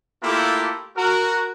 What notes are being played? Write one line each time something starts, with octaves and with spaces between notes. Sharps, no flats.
A3 A#3 E4 F4 G4 A4
F#4 A#4